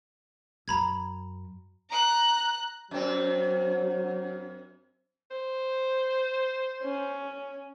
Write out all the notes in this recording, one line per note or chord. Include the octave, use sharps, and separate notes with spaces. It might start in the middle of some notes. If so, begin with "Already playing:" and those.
F#2 A#5 B5 G#6
A#5 F#6
F#2 F#3 C4
C5
C#4